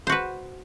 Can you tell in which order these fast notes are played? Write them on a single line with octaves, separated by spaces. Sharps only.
C5 F#4 B4